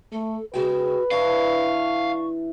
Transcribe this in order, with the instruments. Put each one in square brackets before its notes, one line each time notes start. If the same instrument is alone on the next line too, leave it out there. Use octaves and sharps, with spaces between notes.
[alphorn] A3 [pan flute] A4
[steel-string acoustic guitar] C#3 G#3 G5 [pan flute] F#4 [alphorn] B4
[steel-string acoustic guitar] E3 D4 [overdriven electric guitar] F5 [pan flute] C#6